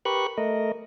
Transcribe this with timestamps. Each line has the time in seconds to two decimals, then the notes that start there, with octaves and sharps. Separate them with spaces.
0.05 G4 A#4 B4 B5 C#6 F#6
0.38 A3 A#4 D#5